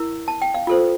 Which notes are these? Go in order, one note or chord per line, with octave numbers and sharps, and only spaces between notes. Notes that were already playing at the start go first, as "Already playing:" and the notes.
Already playing: E4 A#4
A5
G5
F5
F4 A4 C5